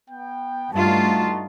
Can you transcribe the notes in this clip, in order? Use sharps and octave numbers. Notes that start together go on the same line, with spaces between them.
B3 G5
G2 A3 D#4 F4 F#4 A5